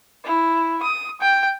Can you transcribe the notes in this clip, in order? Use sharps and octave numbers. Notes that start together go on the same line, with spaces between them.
E4
D#6
G5